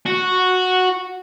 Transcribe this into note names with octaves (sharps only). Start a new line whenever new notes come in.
F#4